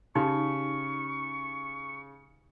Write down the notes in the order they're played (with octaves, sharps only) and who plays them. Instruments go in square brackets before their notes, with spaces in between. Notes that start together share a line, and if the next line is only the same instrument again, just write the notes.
[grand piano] C#3 [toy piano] D#4 G4 [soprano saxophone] C#6